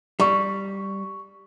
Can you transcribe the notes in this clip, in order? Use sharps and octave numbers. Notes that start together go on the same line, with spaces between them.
G3 C#6